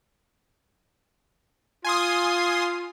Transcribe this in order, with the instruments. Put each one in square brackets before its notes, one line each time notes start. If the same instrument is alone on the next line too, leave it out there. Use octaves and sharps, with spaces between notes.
[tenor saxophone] F4 [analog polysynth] G#5 C6 D#6